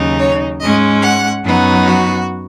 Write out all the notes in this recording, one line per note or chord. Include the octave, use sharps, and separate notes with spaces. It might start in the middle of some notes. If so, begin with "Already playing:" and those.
Already playing: D#2 C#3 F#3 D#4
C#5
G#2 G#3 C#4 D#5
F#5
F#2 F#3 B3 D#4
F#4